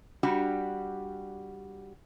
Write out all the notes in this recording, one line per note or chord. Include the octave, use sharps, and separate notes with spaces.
G3 D4 F#4 G4